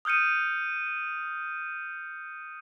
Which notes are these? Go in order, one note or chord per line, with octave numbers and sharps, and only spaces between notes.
D#6 F6 G6 C#7 D#7